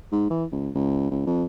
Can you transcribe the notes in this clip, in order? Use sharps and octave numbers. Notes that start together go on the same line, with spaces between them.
G#2
E3
C#2
C#2
C#2
F2